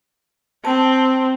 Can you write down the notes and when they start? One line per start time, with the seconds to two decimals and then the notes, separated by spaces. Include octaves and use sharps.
0.65 C4 A5